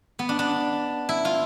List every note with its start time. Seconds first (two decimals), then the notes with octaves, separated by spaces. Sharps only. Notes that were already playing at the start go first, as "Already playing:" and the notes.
0.19 B3
0.29 D4
0.39 D4
1.09 E4
1.25 F4